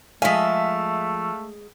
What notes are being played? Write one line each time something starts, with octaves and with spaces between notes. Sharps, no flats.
F3 G#3 A3 E5 F5 G#5 B6